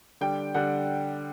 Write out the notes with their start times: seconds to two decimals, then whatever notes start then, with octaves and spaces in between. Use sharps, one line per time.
0.21 D3 G3 G5
0.54 D3 G3 F#5